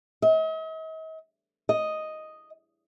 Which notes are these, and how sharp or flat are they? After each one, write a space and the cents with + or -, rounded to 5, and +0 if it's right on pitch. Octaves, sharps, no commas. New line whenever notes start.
D#5 +45
D#5 +0